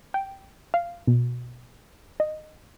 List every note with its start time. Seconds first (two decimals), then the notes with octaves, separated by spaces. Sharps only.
0.14 G5
0.74 F5
1.07 B2
2.20 D#5